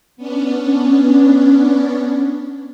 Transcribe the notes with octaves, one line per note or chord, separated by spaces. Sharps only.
B3 C#4 D4